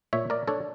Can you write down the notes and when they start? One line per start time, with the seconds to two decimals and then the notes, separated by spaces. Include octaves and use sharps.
0.13 A#2 C#5 E5
0.30 A#4 D5
0.47 D4 A4 C#5